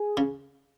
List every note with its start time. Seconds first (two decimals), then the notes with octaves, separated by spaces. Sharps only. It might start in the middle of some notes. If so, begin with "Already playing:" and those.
Already playing: G#4
0.17 C#3